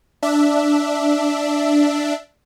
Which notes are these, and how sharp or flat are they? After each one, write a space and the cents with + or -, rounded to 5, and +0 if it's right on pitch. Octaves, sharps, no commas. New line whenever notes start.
D4 +0 E5 +0